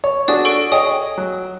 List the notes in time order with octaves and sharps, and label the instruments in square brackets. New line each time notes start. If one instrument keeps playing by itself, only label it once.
[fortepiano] C#5
[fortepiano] D4 F#4 G#4 [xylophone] D5
[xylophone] A4 C#6 D7
[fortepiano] G#4 C#5 D#5 [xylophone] G5 D#6
[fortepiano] F#3